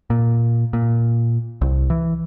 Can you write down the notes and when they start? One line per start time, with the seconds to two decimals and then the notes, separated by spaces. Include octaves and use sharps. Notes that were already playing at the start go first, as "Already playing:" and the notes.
0.10 A#2
0.73 A#2
1.61 C2
1.90 E3